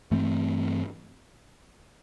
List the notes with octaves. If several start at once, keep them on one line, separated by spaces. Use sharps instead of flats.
G2 E3 A3 C4